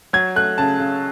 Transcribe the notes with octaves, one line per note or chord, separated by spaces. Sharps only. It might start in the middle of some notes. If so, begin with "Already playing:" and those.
F#3 G#6
A3 F#6
C#3 A5
C#3